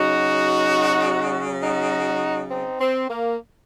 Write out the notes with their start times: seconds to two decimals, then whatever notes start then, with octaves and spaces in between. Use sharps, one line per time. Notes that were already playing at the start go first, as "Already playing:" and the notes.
Already playing: C#3 F#3 D#4 F#4
1.62 D#4 F#4
2.50 C4 D#4
2.80 C4
3.10 A#3